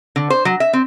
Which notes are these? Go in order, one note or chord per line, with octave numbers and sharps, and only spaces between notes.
D3
C5
F#3
E5
C4